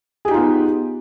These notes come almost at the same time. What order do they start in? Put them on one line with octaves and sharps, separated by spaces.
G#4 G4 D#4 F4 B3